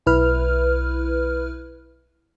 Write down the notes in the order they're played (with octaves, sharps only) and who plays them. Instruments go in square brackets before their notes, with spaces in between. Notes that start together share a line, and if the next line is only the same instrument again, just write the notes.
[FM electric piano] B1 E4 B4 F6